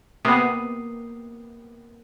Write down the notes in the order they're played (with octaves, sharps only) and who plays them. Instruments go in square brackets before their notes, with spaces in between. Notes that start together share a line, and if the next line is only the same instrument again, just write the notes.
[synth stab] C3 B3 [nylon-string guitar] A#3 [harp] D#6 C7